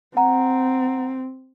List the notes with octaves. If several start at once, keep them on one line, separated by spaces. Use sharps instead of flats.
C4 F#5 A#5